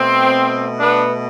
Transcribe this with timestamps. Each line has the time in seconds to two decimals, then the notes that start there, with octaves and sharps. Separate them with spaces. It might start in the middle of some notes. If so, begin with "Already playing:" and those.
Already playing: B2 A3 C4
0.79 B3 D4